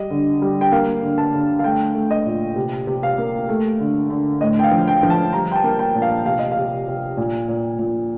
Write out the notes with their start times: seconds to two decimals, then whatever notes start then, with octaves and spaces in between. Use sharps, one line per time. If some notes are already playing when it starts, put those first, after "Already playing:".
Already playing: G3 D#5
0.11 D3
0.42 G3
0.61 G5
0.72 A#3 F5
1.02 D3
1.18 A5
1.34 D3
1.59 F5
1.64 A3 G5
1.95 A3
2.11 D#5
2.26 A#2
2.56 C3
2.87 C3
3.03 F5
3.18 A#3
3.49 A3
3.80 D3
4.10 D3
4.41 A2 D#5
4.59 G5
4.64 F5
4.71 F3
4.87 G5
5.03 F3
5.10 A5
5.33 G3 A#5
5.52 G5
5.56 A5
5.64 A#3
5.79 G5
5.95 A#2
6.02 F5
6.26 C3 F5
6.39 D#5
6.52 F5
6.57 C3
6.88 C3
7.17 A#2
7.48 A#2
7.79 A#2